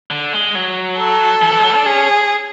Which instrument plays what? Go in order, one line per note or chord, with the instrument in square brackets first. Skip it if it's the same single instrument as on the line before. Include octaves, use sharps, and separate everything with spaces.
[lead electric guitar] D3
G#3
F#3
[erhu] A4
[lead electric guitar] E3
E3
G#3
F#3
D4
[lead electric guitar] C#4 [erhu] G#4